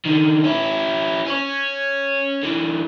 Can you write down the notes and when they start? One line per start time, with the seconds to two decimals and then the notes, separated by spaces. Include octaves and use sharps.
0.05 D3 D#3
0.44 C#4 E4
1.26 C#4 C#5
2.43 D3 E3